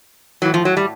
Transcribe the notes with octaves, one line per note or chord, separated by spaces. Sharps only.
A2 E3 F#3
F3
F#3
G3